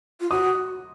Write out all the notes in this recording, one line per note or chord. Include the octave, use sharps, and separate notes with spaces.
F4
F#4 D#6